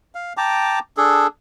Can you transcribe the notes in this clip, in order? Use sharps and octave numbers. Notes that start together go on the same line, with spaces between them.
F5
G5 A5 A#5 D6
D4 G#4 A4